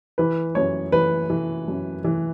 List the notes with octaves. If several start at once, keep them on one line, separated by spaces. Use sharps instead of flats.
E3 B4
F#2 C#5
E3 B4
E3
F#2
E3